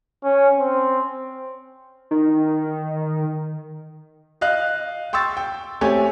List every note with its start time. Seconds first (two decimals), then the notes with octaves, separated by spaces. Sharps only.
0.24 C#4
0.58 C4
2.11 D#3
4.41 D#5 F5 F#6
5.13 G5 C6 C#6 E6 A6
5.37 G5
5.81 A3 C4 G4 C#5 G#5